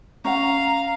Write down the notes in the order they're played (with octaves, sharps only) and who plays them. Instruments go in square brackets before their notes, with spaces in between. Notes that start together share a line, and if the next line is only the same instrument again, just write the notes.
[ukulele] C#4 F#5 [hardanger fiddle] F5 [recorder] A#5